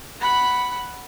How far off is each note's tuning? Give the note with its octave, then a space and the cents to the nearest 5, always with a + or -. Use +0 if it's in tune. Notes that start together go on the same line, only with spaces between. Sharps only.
F#5 +5 B5 +0